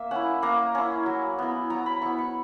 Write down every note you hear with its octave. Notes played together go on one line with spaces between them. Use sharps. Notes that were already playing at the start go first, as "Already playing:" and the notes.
Already playing: A#3 E5
C#4 E4 F#5
A#3 A#5
C#4 E4
F#3
B3 E4
F#3 A#5
B5
B3 E4 C#6
C#6